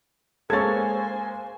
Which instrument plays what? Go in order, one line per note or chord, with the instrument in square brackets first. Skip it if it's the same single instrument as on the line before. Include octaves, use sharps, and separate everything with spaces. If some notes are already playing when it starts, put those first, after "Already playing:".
[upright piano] G#3 A#3 [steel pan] A4 C#5 [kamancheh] C5 G#5 [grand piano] G#6 A6